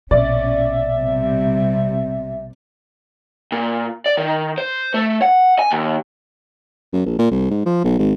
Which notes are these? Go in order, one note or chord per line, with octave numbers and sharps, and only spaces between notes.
A#1 B2 C#4 D5 E5
C3 G3
A#2
D5
D#3
C5
A3
F#5
G#5
D#2
F#2
A#1
A#2
C2
G#2
F3
B1
G#1